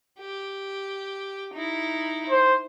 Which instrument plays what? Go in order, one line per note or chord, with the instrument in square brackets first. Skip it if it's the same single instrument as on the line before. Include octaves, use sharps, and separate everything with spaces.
[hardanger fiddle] G4
D#4 E4
[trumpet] C5